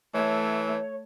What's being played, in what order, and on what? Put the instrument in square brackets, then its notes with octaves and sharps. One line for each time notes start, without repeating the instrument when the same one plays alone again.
[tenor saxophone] E3 [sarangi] A3 [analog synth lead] C#5